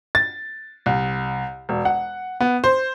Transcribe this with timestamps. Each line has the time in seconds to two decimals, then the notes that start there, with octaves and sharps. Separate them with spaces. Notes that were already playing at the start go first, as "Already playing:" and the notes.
0.15 A6
0.86 C2
1.69 E1
1.85 F#5
2.41 B3
2.64 C5